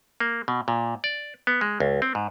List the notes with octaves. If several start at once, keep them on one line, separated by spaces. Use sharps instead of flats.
A#3
B2
A#2
D5
B3
G#3
C#2
C4
G#2